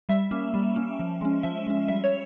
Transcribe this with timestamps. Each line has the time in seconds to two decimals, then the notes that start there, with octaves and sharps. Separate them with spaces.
0.09 G3 E5
0.31 A#3 C#4
0.54 G3
0.76 A#3 C#4
0.99 F3
1.21 G#3 C#4
1.43 F3 E5
1.66 G#3 C#4
1.88 G3 E5
2.04 C#5